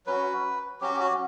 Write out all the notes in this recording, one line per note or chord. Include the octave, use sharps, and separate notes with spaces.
F#3 C#4 F#4 B4
F#3 C#4 F#4 G4
G4
F#4